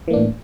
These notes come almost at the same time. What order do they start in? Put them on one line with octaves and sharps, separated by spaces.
E3 A#3 D4 A2